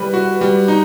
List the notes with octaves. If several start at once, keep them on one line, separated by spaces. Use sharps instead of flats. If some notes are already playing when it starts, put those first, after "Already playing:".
Already playing: G3 B4
F#4
G3
D#4